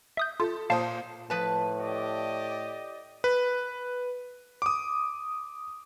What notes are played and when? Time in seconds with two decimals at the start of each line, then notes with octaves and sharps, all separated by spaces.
0.17 E5 D#6 G6
0.40 F4 A4
0.70 A#2 C5 F5 A5 D#6
1.30 A2 F3 B4 A5
1.80 G4 D5 D#5
3.24 B4
4.62 D6 D#6